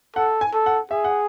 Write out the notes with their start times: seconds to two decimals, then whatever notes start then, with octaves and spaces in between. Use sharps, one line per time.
0.16 A4 F#5
0.41 G#5
0.54 A4
0.66 F#5
0.91 G#4 E5
1.04 F#5